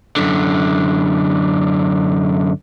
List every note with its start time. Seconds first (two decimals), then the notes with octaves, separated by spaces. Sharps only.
0.17 F#2 D3